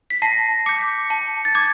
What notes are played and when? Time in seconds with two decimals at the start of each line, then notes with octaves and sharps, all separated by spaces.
0.10 B6
0.22 A5 A#6 C7
0.66 D6 G6 B6 C#7
1.10 A5
1.45 A6
1.55 D6 G6 G#6